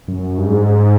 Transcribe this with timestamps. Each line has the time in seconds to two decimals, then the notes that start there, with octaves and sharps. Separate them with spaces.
0.08 F#2
0.38 G2
0.46 G#2